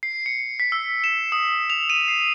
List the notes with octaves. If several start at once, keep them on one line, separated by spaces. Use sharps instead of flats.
C7
C#7
B6
E6
E7
D#6
F7
D#7
C7